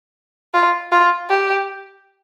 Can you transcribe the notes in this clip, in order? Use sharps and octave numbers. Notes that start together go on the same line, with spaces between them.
F4
F4
G4